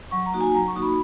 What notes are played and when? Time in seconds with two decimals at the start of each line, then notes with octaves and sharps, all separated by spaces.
0.11 F#3 C#6
0.26 A#5
0.33 A#3 D#4 F#4
0.41 G#5
0.54 F#3 A#5
0.68 C#6
0.75 A#3 D#4 F#4
0.82 B5